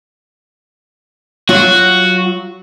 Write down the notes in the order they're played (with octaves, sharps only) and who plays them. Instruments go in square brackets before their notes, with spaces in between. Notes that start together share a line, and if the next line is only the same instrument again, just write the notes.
[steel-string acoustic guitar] F#3 F4 [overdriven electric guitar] F#4